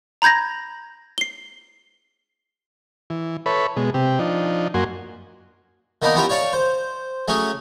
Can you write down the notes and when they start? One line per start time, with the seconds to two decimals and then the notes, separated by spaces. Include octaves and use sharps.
0.22 A#5 B5 G6 G#6 A#6
1.18 C7 G7
3.10 E3
3.46 A4 B4 C#5 E5 B5
3.77 B2 G#3
3.94 C3 G4
4.19 F3 D4 D#4
4.74 F#2 A#3 F#4 G#5 C6
6.02 D#3 A#3 B3 D4 D#4
6.15 B3 C#4 E4 F4 G4 A#4
6.29 C#5 D5 F5 A5 C#6
6.53 C5
7.28 F#3 A3 C#4 G#4